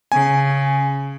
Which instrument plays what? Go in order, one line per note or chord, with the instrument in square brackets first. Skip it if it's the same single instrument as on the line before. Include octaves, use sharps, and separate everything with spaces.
[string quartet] C#3 [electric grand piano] G#5